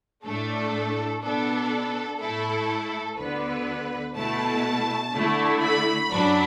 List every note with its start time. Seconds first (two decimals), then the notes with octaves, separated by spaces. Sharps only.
0.24 A2 A3 D4 A4
1.22 B2 B3 D4 A4
2.19 A2 A3 E4 A4
3.17 D2 D3 B3 B4
4.15 B2 A3 E4 A5
5.12 D3 A3 E4
5.61 B5
6.10 F#2 F#3 D4